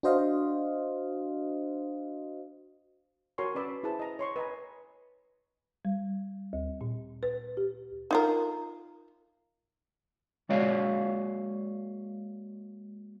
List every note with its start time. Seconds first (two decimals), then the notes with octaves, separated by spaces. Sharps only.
0.03 D4 F#4 C5 D#5 F5
3.38 F#4 A#4 C#5 G#5 C6 C#6
3.55 C#4 B4 D5 B5 E6
3.83 E4 G#4 B4 C5 A5
3.99 D#5 A#5
4.19 C#5 C6 C#6
4.36 B4 D#5 G#5 A#5
5.85 G3
6.53 D2
6.81 A#2
7.23 B4
7.57 G4
8.11 D#4 F4 A#4
10.49 G#3 A#3 F#4 C#5 D5 F5